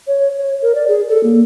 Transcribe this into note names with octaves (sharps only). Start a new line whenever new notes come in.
C#5
C#5
A#4
D5
G#4
A4
A#3